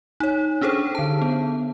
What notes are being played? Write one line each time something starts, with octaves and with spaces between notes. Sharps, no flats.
D#4 C#5
C#4 D4 G#4 A4 C5
D3 A5
B3